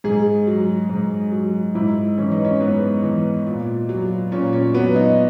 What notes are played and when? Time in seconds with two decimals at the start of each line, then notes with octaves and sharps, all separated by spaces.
0.04 G#2 G#4
0.47 F#3
0.89 G#2
1.32 F#3
1.75 G#2 E4
2.18 E3 C#4
2.31 D#4
2.45 C#4
2.60 G#2 B3
3.04 E3
3.46 A#2
3.89 F#3
4.32 A#2 C#4
4.53 C#4
4.74 F#3 B3
4.96 D#4